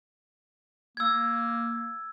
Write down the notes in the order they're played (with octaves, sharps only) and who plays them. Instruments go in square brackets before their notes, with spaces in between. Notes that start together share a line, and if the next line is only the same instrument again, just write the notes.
[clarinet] A#3 [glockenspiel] E6 G#6